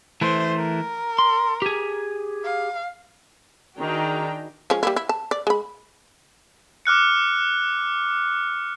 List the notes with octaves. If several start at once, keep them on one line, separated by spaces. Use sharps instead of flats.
E3 A3 C5
A#4
C6
G4 G#4
F5
D#3 D4 F#4 G#4 G5 A#5
F3 G#3 C#4
G3 A#3 E4
E4
A5
D5
G#3 B5
D6 F6 F#6 C#7